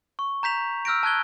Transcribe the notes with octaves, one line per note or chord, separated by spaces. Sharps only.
C#6
A#5 G6 B6 F7
E6 F6 G6 A#6 D7
A5 F#6 G#6 G7